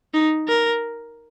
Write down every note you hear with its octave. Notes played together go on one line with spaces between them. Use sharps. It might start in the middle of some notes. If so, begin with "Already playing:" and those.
D#4
A#4